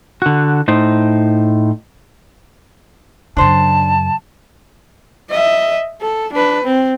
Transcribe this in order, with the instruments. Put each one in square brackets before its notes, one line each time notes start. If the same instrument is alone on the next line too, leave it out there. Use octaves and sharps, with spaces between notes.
[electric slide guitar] D3 F#4
A2 D#4 C5
[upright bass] F#2 C#3 [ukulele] D4 C5 [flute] A5
[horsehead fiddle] D#5 E5
A4
D4 B4
C4